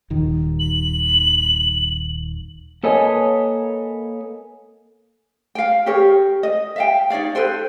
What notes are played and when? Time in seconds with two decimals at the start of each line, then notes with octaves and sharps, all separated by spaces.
0.10 D#1 D#3
0.59 F#7
2.83 A#3 A4 B4 C#5 D#5 G#5
5.55 F5 G5
5.86 G4 G#4 A#4 C#5
6.43 D#5
6.76 E5 F5 G5
7.10 D#4 C#5 D5 F5
7.35 A4 B4 C5 G5